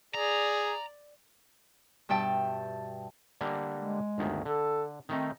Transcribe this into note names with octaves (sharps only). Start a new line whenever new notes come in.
G#4 D5 A#5
G2 B2 E5 G5 A5
D3 G3 A#3
G#3
G1 D2 D#3
D3 A4
D#3 A3 C4 D#4